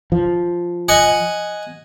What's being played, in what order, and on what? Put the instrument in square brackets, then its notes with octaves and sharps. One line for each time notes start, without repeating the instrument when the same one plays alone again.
[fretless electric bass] F3
[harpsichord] D#5 F#5 G#5